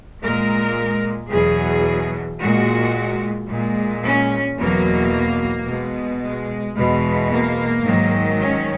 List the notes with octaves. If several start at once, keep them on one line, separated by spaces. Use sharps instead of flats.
A#2 G#3 A#4
E2 B2 F#3 G#4
A#2 G#3 F#4
A#2 G#3
C#4
E2 B2 F#3 A#3
B2 G#3
G#3
E2 B2 G#3
A#3
G#2 D#3 F#3
C#4